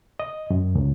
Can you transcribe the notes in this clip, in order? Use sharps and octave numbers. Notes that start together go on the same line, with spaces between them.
D#5
F#2
C#2